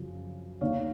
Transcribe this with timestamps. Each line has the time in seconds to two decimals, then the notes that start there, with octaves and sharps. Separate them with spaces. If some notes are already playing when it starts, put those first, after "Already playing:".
Already playing: F#2 C#3 F3
0.61 D#2 D#3 A#3 D#4 C#5 F5